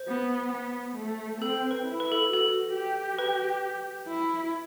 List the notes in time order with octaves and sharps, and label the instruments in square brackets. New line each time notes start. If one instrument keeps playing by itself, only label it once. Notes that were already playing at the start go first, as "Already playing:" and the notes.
Already playing: [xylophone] C5
[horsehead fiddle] B3
B3
A3
[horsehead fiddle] C4 [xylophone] A4
[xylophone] B4
[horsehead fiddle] E4
[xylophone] B4
A4
[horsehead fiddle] F#4 [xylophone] A4
[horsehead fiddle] G4
[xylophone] B4
[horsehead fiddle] E4